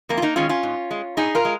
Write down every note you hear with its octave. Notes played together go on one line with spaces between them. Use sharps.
F2 A#3
F4
A#3 D#4
D#3 G#3 C#4 F4
C#4 F4
G#2
G#3
A#2 D#4 G#4
F4 A#4
G#3